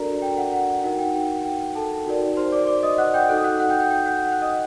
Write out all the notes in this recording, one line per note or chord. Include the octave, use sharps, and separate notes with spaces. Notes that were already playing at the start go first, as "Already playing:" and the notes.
Already playing: D4 F#4 A4 A#4 D5 A#5
G5
F#5
F#5
D#4 F#4 A#4 F#5
G5
G5
G5
A4 A5
D#4 F#4 A#4 D5
C5 C6
D5 D6
D5 D6
D#5 D#6
F#5 F#6
G5 G6
D#4 F#4 A4 F#6
D#6
F#5 F#6
F#5 F#6
G5 G6
G5 G6
G5 G6
F#5 F#6
F#5 F#6
D#5 D#6